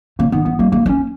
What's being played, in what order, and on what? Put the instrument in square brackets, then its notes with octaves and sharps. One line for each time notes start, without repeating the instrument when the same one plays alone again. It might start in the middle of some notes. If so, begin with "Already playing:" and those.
[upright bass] C#3 [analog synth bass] A#3
[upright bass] D#3 [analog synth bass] B3
[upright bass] E3 [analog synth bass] B3
[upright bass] G3 [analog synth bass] A#3
[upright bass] G#3 [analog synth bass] A#3
[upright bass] G#3
[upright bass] A#3 [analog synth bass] C#4